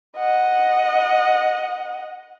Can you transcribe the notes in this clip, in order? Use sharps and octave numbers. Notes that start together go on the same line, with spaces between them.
D#5 F#5